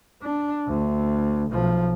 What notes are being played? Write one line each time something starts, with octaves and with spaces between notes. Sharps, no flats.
D4
D2
B1 F3